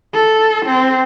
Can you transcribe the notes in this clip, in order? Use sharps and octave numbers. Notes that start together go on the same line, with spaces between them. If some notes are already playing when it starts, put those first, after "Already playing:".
A4
C4